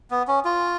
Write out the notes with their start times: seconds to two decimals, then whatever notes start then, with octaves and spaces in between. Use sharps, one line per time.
0.11 B3
0.28 C#4
0.45 F4